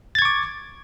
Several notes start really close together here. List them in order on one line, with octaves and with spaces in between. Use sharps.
A6 G#6 C#6 D6